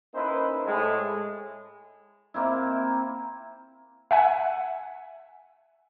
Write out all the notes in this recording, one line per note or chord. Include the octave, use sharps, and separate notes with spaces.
A#3 C#4 D#4 E4 B4 C5
A2 G#3
A#3 C4 E4
E5 F#5 G#5